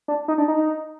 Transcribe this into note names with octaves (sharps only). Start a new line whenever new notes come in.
D4
D#4
D4
D#4